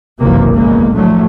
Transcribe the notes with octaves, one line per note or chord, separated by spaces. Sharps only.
F#1 B1 C3 D#3 E3 A#3
E2 C#3 G#3 A#3
A2 D3 F3 F#3 A3